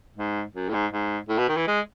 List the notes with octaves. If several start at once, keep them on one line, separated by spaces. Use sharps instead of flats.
G#2
F#2
A2
G#2
G#2
A2
B2
D#3
E3
G#3